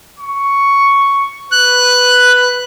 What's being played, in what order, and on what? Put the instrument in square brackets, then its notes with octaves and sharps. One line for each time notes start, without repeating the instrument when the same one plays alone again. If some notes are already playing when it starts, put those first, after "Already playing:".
[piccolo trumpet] C#6
[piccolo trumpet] B4 [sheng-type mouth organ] F#6